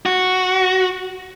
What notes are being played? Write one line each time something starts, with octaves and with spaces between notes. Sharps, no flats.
F#4